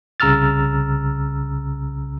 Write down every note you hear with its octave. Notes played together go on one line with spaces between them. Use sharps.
C2 C#3 A#5 E6 F6 A6